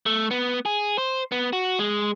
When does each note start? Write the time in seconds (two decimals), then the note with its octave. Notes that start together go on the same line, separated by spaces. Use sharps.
0.06 A3
0.31 B3
0.66 G#4
0.98 C5
1.32 B3
1.53 F#4
1.79 G#3